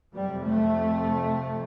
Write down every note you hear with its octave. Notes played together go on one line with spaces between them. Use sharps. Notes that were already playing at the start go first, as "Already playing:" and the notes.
F2 C3 G3
A3